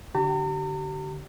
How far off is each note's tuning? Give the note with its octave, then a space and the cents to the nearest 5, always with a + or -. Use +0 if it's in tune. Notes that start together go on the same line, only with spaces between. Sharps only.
D3 +0 G4 -40 A#5 -40